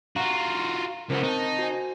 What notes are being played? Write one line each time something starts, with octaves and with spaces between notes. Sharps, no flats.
F4 F#4 F5 A#5
C#2 B3 A#4 C5
C4 D#4 A5
F#4 C5 G#5